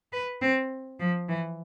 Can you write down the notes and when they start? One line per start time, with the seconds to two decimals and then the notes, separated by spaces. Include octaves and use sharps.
0.13 B4
0.42 C4
1.00 F3
1.29 E3